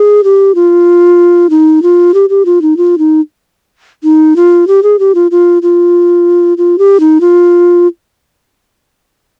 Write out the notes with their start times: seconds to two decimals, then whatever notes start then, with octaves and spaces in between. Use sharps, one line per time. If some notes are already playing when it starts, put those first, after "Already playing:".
Already playing: G#4
0.24 G4
0.55 F4
1.50 D#4
1.83 F4
2.14 G4
2.30 G4
2.45 F4
2.62 D#4
2.77 F4
2.98 D#4
4.04 D#4
4.36 F4
4.68 G4
4.83 G#4
4.99 G4
5.15 F4
5.31 F4
5.62 F4
6.58 F4
6.79 G4
7.00 D#4
7.21 F4